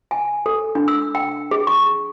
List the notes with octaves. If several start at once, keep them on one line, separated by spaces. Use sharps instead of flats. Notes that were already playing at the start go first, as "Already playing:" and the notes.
G#5
A4
D4
E6
G5
G#4
C#6